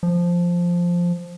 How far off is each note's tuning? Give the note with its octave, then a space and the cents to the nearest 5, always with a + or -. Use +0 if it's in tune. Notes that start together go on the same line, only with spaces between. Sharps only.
F3 +0